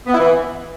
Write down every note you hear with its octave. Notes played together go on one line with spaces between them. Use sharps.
B3
E4
E3